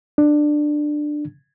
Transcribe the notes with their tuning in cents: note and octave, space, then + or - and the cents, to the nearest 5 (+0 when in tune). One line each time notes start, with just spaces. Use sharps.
D4 +15